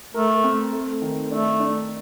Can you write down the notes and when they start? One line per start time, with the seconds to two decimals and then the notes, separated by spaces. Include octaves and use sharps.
0.14 A3 A#4
0.43 C4
0.73 A3
1.02 D#3
1.31 A3 D4
1.60 D4